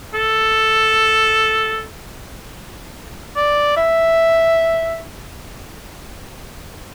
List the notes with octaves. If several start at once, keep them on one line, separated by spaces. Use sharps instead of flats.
A4
D5
E5